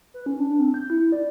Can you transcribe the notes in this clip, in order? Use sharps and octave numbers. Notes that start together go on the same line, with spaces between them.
B4
C#4
D4
C4
G6
E4
D5